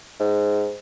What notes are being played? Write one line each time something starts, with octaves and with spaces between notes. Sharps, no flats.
G#2